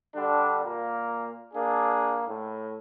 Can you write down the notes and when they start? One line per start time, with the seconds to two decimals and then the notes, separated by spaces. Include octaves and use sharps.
0.15 D3 G3 D4
0.64 A#2 A#3
1.54 A#3 D4 G#4
2.28 A2